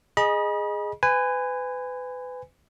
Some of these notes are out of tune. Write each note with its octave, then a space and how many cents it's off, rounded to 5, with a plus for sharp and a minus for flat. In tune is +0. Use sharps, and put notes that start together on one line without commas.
G#4 +0 D#5 -15 B5 -40
B4 +30 G#5 -15